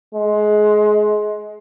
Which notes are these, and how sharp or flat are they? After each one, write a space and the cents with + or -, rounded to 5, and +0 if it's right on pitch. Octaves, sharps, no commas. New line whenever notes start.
G#3 +20